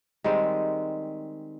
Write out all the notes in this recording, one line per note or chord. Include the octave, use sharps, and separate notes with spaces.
D#3 G3 G#3 C4